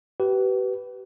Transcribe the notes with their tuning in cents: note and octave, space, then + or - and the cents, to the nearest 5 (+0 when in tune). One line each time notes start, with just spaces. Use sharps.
G4 -35 B4 +0